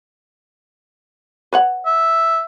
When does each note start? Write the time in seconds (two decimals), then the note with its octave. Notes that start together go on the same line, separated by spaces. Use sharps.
1.53 B4 C#5 F#5
1.86 E5